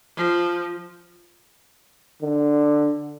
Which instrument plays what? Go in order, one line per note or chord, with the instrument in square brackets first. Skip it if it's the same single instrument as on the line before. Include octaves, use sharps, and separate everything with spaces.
[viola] F3
[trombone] D3